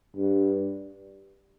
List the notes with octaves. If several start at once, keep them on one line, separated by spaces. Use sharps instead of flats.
G2